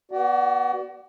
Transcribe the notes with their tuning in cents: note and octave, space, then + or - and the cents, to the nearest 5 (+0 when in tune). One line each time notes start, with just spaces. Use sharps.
B3 -20 F#4 +35 D5 -10